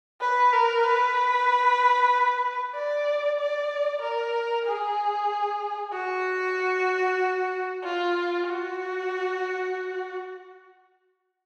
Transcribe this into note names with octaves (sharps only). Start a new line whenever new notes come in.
B4
A#4
B4
D5
D5
A#4
G#4
F#4
F4
F#4